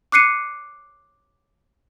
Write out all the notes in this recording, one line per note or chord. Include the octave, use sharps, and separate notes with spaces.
D6 F#6 C7 C#7 D#7